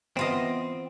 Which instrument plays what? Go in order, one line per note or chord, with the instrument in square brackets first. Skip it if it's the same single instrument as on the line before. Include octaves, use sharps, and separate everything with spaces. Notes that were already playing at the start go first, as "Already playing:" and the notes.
[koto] E3 F4 D#5 [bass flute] B3 [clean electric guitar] C4